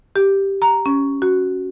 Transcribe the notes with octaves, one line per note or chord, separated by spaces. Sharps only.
G4
A#5
C#4
F#4